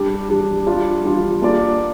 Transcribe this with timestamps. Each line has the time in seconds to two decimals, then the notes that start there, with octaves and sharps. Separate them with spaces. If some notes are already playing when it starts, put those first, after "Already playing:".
Already playing: G3 D4 G4
0.29 G3 D4 G4
0.67 G3 D4 F4
1.04 G3 D4 F4
1.42 A#3 D4 F4 G#4 D5